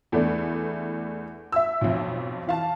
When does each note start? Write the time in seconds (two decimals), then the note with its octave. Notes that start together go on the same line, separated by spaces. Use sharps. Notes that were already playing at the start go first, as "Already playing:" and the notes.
0.12 E2 A3 B3 D4
1.52 E5 E6
1.81 B1 F2
2.47 E3 F5 A5